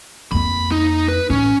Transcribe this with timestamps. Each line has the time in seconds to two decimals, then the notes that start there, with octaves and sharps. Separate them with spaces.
0.32 F2 A#3 B5
0.71 D#4
1.08 B4
1.30 A1 C#4